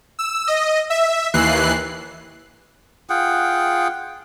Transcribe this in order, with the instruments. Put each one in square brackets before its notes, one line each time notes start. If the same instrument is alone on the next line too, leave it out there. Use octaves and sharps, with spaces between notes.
[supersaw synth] E6
D#5
E5
D#2 E3 F#6 C7
[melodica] F4 G#4 F#5 G5